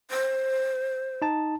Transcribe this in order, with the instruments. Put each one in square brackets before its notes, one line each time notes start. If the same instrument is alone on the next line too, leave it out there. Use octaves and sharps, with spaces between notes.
[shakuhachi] C5
[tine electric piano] D#4 A5